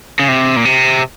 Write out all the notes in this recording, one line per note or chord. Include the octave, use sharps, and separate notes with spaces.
C#3
C3
A#2
C3